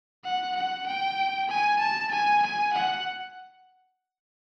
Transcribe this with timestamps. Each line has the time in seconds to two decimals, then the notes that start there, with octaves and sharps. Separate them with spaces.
0.24 F#5
0.56 F#5
0.86 G5
1.49 G#5
1.79 A5
2.11 G#5
2.42 G#5
2.73 F#5